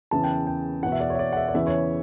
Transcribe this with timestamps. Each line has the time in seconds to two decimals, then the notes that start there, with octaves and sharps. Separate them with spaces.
0.11 E2 C#3 E3 A5
0.24 G5
0.47 G5
0.83 E2 B2 F#5
0.92 E5
1.00 D5
1.10 C#5
1.15 E5
1.19 D5
1.33 F#5
1.37 E5
1.49 D5
1.54 E2 C#3 E3 E5
1.67 C#5